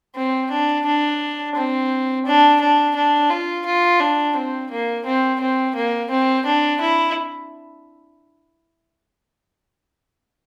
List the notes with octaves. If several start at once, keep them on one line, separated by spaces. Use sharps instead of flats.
C4
D4
D4
C4
D4
D4
D4
F4
F4
D4
C4
A#3
C4
C4
A#3
C4
D4
E4